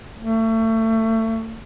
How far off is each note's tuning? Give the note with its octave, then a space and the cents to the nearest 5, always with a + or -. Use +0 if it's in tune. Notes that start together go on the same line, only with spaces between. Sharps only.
A3 +30